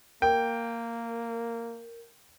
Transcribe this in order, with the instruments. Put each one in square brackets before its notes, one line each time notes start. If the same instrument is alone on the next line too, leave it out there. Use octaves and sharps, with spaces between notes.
[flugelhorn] A#3 [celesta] A#4 [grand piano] G5